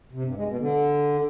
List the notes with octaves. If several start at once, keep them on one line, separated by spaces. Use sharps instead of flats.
C3
G2
G#3
B2
D3